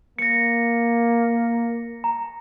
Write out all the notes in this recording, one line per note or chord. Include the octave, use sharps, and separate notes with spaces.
A#3 A#6 C#7
A#5